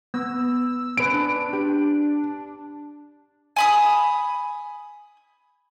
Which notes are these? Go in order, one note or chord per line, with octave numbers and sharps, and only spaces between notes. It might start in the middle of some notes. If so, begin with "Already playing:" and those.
B3 E6
C#4 B4 D7
D4 B4
G4
G#5 B5 D#6